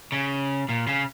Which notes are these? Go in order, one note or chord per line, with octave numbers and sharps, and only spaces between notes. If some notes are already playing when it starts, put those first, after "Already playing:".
C#3
A#2
C#3